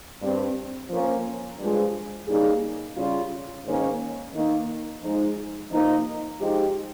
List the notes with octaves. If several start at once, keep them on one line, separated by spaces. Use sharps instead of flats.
G2 G3 C4
F3 A#3 C#4
G2 F3 G#3
C#3 G3 A#3 D#4 G#4
C#3 G3 C#4 F4
G#2 D#3 A#3 C#4
D#3 A#3 D#4
F3 G#3 D#4
C3 F3 A#3 D#4
F3 G#3 D#4 G4